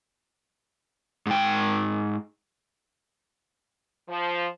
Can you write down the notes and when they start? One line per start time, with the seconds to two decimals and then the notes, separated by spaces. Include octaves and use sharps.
1.26 G#2 G5
4.08 F3